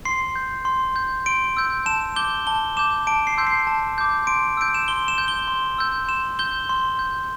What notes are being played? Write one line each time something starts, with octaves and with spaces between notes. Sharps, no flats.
C6 C7
G6
C6
G6
C6 D7
E6 G6
A5 E7
D6 G6 G7
A5 G7
D6 G6 E7
A5 D7
C7
C6 E6 G6
C7
A5
D6 G6
C6 D7
E6 G6 D7
E7
C6 G7
E7
G6
G7
C6
E6 G6
C6 E7
G6 G7
C6
G6